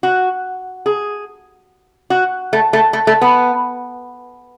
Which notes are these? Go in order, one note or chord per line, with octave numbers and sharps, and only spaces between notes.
F#4
G#4
F#4
A3
A3
A3
A3
B3